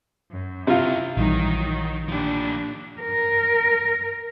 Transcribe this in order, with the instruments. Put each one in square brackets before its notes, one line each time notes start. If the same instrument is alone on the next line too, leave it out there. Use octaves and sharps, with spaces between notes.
[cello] F#2
[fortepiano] C3 F4 [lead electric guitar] E4 G4
[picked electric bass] A#1 E3 G3 [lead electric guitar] D#3 [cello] F#3 D#4
[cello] A#2 D4 [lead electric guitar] F3 G4
[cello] A#4